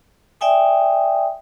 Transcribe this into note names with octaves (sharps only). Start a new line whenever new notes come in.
D5 E5 G5 G#5 D#6